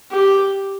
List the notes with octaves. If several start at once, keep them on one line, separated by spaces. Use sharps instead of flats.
G4